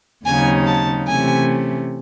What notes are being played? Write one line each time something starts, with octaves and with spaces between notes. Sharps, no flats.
D#2 C#3 F#3 C4 D#4 G#5
A5
C3 E3 A3 C#4 G#5